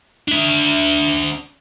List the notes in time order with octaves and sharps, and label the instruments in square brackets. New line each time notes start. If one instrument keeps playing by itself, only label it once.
[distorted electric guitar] D4 E5